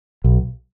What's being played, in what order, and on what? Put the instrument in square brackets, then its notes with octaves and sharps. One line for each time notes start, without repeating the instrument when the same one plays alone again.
[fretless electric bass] B1